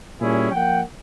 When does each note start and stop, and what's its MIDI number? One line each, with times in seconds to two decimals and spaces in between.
0.20 0.51 46
0.20 0.51 55
0.20 0.51 61
0.20 0.51 64
0.20 0.51 68
0.51 0.81 53
0.51 0.81 58
0.51 0.81 78
0.51 0.81 79